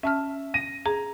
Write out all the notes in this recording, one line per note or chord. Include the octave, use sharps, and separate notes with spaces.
C#4 E5 A5 F6
A#6 D#7
G#4 A#5